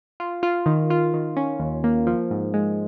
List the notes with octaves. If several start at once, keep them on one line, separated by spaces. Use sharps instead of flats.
F4
F4
D#3
F4
D#3
C#4
D#2
A#3
F3
G#2
G#3